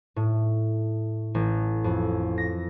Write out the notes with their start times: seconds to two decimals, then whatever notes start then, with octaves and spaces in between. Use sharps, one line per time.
0.16 A2
1.35 A1
1.84 F2
2.38 A#6